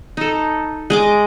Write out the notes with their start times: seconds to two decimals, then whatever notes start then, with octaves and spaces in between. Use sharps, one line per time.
0.17 D#4 A4
0.90 G#3 D#5 D6